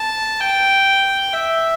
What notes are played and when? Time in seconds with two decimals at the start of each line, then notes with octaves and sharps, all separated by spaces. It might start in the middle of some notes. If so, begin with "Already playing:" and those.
Already playing: A5
0.40 G5
1.33 E5